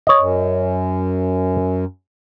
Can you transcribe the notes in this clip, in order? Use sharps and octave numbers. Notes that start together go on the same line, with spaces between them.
C#5 D#5
F#2